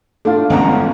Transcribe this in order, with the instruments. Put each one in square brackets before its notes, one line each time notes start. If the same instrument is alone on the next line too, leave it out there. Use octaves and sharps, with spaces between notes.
[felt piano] A3 F4 [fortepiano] D4
[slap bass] G1 G#3 C#4 [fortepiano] E2 F#5 A#5